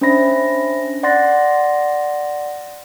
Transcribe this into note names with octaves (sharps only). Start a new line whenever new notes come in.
C#4 D4 C5 E5 B5 A#6
D5 F#5 C6 A6 A#6